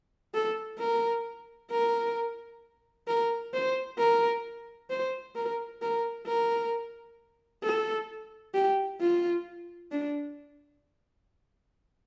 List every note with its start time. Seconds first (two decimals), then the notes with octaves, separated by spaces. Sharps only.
0.34 A4
0.80 A#4
1.71 A#4
3.08 A#4
3.54 C5
3.99 A#4
4.90 C5
5.36 A#4
5.82 A#4
6.27 A#4
7.63 A4
8.54 G4
9.00 F4
9.92 D4